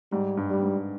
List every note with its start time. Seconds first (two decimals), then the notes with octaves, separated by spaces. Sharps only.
0.12 G#2 G3
0.37 G2
0.50 G3
0.59 G2
0.63 G#2